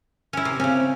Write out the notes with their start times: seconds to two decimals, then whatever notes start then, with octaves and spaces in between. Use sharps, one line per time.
0.33 C#4 E4
0.45 C3
0.60 C#3 C4 C#4